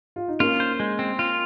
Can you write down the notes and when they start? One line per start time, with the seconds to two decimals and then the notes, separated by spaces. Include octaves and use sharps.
0.16 F4
0.28 D#4
0.40 A#3 C#4 F4
0.60 C5
0.80 G#3
0.99 C4
1.19 F4